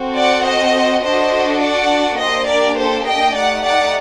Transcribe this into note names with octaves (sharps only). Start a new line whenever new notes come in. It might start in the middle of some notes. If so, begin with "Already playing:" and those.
Already playing: C4 F#4 A4
D5 F#5
C5 D#5
D4 F#4 A4 C5 D#5
D5 F#5
A#3 D4 G4 C5 D#5
A#4 D5
A4 C5
D#5 G5
A3 D#4 G4 D5 F#5
D5 F#5